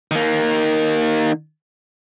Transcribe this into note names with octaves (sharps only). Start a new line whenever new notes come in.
D#3 A#3